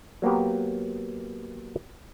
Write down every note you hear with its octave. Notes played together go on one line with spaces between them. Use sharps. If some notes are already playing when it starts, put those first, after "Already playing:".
F#3 A#3 B3 G4